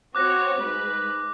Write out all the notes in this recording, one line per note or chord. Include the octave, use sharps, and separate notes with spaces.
C4 F#4 C#5 D6 F#6 A#6
G#2 G#3 B4